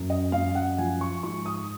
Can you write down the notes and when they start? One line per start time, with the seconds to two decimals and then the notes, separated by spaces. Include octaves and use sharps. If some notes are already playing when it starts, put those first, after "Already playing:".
Already playing: F#2
0.10 D#5
0.32 F#2 F5
0.55 F#5
0.78 F3 G#5
1.01 C#6
1.23 G#2 C#6
1.46 D#6